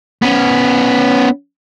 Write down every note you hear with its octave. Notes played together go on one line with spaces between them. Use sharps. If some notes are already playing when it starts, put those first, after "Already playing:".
B3 C#4